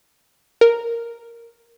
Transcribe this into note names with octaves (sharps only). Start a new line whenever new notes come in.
A#4